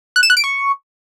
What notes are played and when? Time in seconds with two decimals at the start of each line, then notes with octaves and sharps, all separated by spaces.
0.16 F#6
0.23 E7
0.30 F#6
0.37 D7
0.44 C#6